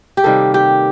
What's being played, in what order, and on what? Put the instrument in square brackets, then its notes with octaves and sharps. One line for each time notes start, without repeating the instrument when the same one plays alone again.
[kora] G4
C3 D#3 G3 A#3 A4
G4